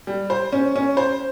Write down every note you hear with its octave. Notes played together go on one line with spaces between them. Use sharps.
G3
C5
C#4
C#4
C5